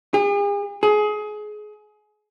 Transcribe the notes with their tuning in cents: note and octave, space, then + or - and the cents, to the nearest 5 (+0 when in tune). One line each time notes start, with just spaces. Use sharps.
G#4 -45
G#4 +25